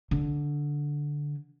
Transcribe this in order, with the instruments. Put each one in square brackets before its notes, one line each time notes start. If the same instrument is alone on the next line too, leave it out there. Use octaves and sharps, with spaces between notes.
[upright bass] D3